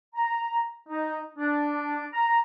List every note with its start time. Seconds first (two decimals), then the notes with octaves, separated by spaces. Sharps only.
0.15 A#5
0.88 D#4
1.37 D4
2.13 A#5